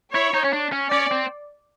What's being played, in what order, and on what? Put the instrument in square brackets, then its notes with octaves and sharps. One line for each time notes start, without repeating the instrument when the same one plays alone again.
[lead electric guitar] E4 [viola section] C#5
[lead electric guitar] D#4
C#4
D4
C#4
[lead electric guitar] C#4 [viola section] D5
[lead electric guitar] C4